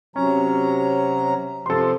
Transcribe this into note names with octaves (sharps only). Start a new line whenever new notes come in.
C3 F#3 C#4 A#5
C3 F3 A4 C6